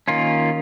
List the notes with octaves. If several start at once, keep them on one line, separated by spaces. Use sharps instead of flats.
D#3 A#3 C#4 F4